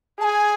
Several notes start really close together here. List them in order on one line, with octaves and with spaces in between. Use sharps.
G#4 A5 G#5